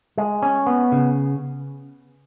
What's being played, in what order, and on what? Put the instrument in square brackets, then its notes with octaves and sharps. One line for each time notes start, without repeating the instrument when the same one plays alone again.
[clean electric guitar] G#3
C#4
B3
C#3